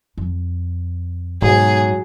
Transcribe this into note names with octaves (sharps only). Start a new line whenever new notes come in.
F2
G#2 B2 F#3 G#4